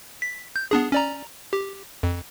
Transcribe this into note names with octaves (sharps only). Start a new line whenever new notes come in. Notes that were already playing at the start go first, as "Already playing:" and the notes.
B6
G6
B3 D4 G#4
C#4 D5 A#5
G4
F2